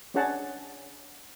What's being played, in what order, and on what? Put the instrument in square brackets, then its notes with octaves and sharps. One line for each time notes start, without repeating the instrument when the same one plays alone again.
[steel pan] C#4 D4 G#4 C#5 F#5 A5